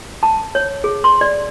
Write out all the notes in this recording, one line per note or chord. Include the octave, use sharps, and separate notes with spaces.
A5
C#5
G#4
C6
D5